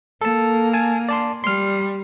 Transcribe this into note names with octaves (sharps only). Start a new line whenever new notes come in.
A#3 A4 A5
G#5 A5
D5 A5 C6
G3 C6 F6